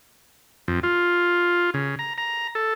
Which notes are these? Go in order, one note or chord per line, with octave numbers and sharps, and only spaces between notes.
F2
F4
C#3
A#5
A#5
A4